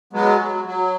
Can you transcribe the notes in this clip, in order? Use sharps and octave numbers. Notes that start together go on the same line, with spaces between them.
F#3 G#3 B3
F#3
F#3